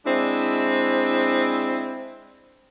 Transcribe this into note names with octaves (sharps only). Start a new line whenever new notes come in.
G#3 C4 D4 E4